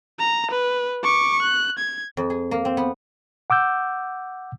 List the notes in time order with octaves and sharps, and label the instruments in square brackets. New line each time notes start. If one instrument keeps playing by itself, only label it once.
[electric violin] A#5
B4
C#6 D6
F#6
G#6
[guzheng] F2
G#4
A#3
C4
B3
[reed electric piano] F#5 D6 E6 G6